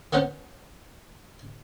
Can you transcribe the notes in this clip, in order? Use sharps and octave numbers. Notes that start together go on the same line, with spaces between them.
A#3 B3 C#4 C5 F#5